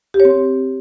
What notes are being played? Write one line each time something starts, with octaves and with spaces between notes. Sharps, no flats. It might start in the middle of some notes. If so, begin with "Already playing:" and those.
G4
C#5
C4